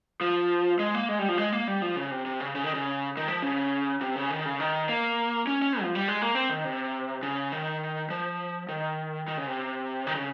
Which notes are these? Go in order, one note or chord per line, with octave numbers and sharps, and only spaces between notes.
F3
G#3
A#3
G#3
G3
F3
G#3
A#3
G3
F3
C#3
C3
C3
C#3
C#3
D#3
C#3
D#3
F3
C#3
C3
C#3
D#3
C#3
D#3
A#3
C#4
C#4
F3
G3
G#3
A#3
C4
D#3
C3
C#3
D#3
F3
D#3
D#3
C#3
C3
D#3
C#3